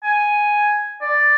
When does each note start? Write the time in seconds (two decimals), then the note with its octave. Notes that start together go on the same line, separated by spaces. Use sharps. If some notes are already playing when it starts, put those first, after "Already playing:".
0.04 G#5
1.02 D5